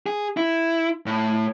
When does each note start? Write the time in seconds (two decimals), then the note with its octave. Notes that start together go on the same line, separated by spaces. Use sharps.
0.06 G#4
0.37 E4
1.06 A2